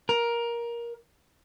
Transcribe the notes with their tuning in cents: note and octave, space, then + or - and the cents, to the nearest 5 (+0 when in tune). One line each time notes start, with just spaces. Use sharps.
A#4 +15